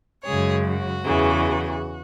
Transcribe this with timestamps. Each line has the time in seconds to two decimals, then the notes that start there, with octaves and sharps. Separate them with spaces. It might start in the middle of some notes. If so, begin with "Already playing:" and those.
0.24 F#2 C#3 G#3 G#4 C#5
0.64 F#4
1.03 E2 C#3 E3